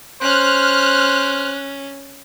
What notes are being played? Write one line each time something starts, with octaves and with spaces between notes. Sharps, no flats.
C#4 C5 F6 F#6